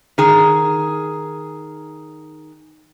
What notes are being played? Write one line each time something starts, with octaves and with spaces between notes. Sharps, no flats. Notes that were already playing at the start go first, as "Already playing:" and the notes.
D#3 G#4